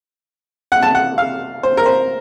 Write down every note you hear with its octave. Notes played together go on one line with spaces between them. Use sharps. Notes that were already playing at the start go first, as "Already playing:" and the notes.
F#5
A5
F#5
F5
C5
A#4
C5